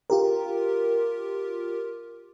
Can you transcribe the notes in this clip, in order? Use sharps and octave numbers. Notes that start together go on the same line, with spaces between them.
F4 G4 A#4